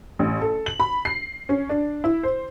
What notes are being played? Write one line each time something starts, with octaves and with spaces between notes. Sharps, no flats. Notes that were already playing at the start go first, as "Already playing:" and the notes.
A1
A4
F#7
B5
C7
C#4
D4
E4
C5